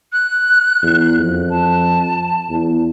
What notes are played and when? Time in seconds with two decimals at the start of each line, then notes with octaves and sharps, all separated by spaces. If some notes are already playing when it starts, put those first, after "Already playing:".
0.13 F#6
0.83 E2
1.19 F2
1.50 A5
2.49 E2